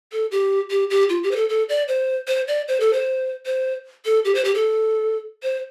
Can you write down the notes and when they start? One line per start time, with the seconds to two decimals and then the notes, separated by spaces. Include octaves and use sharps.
0.12 A4
0.31 G4
0.70 G4
0.90 G4
1.09 F4
1.23 G4
1.31 C5
1.36 A4
1.49 A4
1.69 D5
1.88 C5
2.28 C5
2.48 D5
2.68 C5
2.80 A4
2.93 C5
3.46 C5
4.05 A4
4.25 G4
4.35 C5
4.45 G4
4.55 A4
5.43 C5